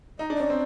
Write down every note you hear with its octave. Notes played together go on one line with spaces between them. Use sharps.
D#4 D#5
D4 D5
C#4
C4